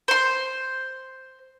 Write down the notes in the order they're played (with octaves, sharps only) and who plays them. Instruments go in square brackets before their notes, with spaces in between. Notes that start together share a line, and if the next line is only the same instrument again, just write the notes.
[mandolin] C5 C6